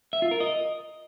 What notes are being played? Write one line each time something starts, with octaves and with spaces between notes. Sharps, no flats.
E5
F4
A#4
D#5